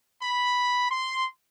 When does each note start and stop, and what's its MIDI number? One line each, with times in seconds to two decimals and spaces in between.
0.22 0.87 83
0.91 1.26 84